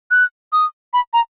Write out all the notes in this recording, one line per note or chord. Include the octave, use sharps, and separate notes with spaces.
F#6
D#6
B5
A#5